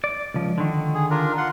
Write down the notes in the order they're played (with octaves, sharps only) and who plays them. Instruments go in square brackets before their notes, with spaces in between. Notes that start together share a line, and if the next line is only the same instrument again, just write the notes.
[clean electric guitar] D5
C#2 F3
D3 D#3
[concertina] G#4
D4 F4 A#4
F4 F#5 C6